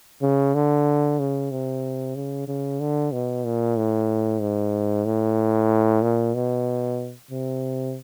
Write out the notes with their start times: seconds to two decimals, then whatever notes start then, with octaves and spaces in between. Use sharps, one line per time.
0.22 C#3
0.55 D3
1.19 C#3
1.51 C3
2.16 C#3
2.48 C#3
2.80 D3
3.12 B2
3.45 A#2
3.77 A2
4.41 G#2
5.05 A2
6.02 A#2
6.34 B2
7.31 C3